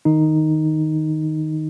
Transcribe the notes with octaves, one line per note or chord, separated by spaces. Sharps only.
D#3 D#4